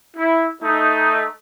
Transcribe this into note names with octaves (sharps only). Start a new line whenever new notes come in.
E4
A3 D#4